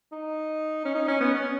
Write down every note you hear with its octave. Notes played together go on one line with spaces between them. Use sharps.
D#4
C#4
D#4
C#4
B3
C#4